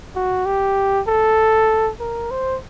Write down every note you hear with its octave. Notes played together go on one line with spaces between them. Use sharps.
F#4
G4
A4
A#4
C5